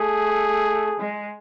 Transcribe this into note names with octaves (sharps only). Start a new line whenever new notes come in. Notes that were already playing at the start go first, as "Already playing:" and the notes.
Already playing: A3 G#4
G#3